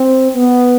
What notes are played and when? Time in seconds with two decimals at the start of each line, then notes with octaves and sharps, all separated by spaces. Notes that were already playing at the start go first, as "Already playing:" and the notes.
Already playing: C4
0.34 B3